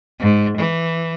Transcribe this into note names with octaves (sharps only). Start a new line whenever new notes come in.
G#2
E3